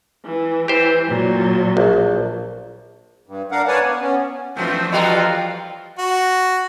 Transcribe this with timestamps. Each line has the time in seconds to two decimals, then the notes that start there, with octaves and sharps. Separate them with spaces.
0.23 E3
0.68 E3 G4 C5
1.09 A#2 F#3
1.77 A#1
3.27 G2
3.52 D4 A#4 F5 F#5
3.68 B4 C#5 D5 F#5 G#5 A5
3.84 B3
4.01 B3 C#4
4.57 F#2 E3 F3 A3 C4
4.93 G3 F4 F#4 A4 D#5 F5 G5 A#5
5.99 F#4